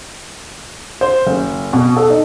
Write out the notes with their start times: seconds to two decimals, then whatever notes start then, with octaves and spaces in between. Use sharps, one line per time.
1.01 C5
1.27 F#1
1.73 B2
1.97 A4
2.10 D#4